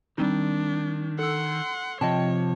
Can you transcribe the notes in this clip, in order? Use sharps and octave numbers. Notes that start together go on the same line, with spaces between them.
D#3 G3 C4 D4 D#4
A4 F#5 C6 E6
C3 F3 C#5 D#5 G5 A5